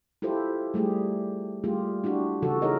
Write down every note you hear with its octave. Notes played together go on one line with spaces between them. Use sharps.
E4 F4 G4 A4 C5
G3 A3 G4 G#4
G3 A3 A#3 F4 G4 G#4
D4 E4 F#4 G4
C#3 E3 F3 F#4 A4
D#4 E4 G#4 A#4 C#5 D#5